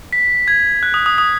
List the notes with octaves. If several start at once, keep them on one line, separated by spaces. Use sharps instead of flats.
B6
G#6
F#6
D#6
D#6
D#6